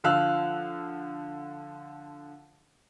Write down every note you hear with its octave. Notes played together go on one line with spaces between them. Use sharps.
D3 F3 F5 E6 F#6